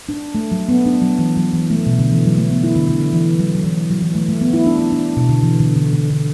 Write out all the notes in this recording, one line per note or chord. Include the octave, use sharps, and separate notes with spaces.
D4
A3
F#3
B3
D4
F#3
E3
F#3
E3
A3
B2
D3
E3
F#3
A3
B3
E4
D3
D3
E3
F#3
F#3
E3
F#3
E3
A3
A3
B3
E4
D4
E4
D4
B2
D3
E3
D3
D3
D3
D3